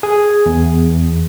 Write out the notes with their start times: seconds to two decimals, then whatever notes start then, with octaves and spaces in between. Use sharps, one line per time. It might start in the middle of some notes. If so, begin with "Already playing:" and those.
0.03 G#4
0.46 E2